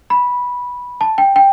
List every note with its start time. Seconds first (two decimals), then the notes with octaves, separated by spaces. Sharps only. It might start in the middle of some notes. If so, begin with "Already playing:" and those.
0.10 B5
1.01 A5
1.18 G5
1.36 G5